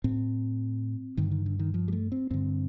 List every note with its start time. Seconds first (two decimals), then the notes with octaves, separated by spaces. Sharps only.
0.04 A2 C4
1.17 G2 D3 D#3
1.32 D#3
1.46 D3
1.59 D#3
1.74 F3
1.88 G3
1.93 A3
2.12 C4
2.31 G2 D3 C4